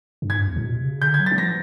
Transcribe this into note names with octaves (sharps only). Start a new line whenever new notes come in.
G2
G#2 G#6
G2
E2
A2
B2
C3
C#3
D3 G6
G#6
F#3
A6
F#3
F3 A#6